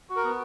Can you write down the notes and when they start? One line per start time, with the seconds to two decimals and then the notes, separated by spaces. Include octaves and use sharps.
0.10 F#4
0.16 A#4
0.24 B3